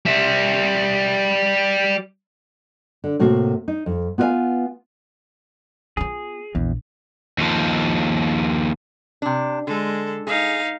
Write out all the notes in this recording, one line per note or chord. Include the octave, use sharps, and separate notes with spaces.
G3 E5
D3
A2 C3 A#3 F#4
D#4
F2
B3 F4 B4 D5 F5 G#5
B3 F4 G#4
A#1 E2
D#2 F3
C3 D4
D3 G#3 A4
D#4 G#4 F5